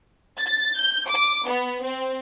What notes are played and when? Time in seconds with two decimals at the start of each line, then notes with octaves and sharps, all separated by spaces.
0.38 A6
0.77 G6
1.08 D6
1.47 B3
1.83 C4